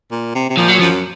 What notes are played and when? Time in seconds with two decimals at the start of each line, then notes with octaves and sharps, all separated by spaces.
0.11 A#2
0.35 C3
0.49 C3
0.57 A#2 F3
0.68 F#3
0.79 F#2 F3